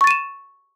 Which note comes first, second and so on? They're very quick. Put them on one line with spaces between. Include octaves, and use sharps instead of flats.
C#6 A6 D#7 E7